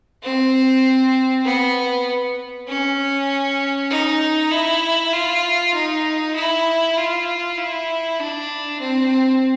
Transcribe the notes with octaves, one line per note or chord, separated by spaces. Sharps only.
C4
B3
C#4
D#4
E4
F4
D#4
E4
F4
E4
D4
C4